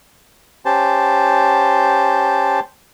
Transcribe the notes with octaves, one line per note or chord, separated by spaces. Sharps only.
C#4 G4 C5 A5